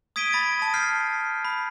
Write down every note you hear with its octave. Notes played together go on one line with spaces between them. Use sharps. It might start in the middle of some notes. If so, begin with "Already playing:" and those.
D#6 G#6 B6 D7 D#7 G7
B5 A6 D7
A5 D#6
F6 G6 C7
B5